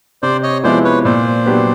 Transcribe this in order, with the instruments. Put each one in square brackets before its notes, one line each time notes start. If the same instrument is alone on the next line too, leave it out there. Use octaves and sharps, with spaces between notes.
[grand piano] C3 [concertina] C5 D5
[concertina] C#5 D#5
[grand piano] F3 G#3 B3 E4 [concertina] C5 D5
[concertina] B4 C#5
[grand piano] A#2 [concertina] C5 D5
[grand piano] F#3 B3 D4 G4